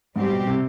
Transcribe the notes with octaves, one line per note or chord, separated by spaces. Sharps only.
G#2 G3 C4 G4
B2
C3